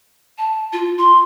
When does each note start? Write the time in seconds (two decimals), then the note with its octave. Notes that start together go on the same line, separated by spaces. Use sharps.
0.38 A5
0.73 F4
0.98 C6